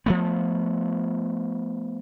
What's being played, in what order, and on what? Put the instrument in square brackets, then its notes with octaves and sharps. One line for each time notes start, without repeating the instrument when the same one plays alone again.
[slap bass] F3 A3 B3